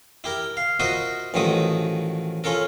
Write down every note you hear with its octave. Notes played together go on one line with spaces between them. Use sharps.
E4 G4 A#4
F5
F4 F#4 A#4 C5 D#5 E5
A1 D#3 F3 F#3 E5 D#6
C#4 F4 A4 A#4